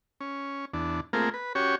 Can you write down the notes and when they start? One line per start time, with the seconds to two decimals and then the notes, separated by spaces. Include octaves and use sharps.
0.21 C#4
0.74 E2 D4
1.13 A3 A#3 C4 F4 G#4 A#4
1.34 B4
1.55 C#4 F#4 G4 C#5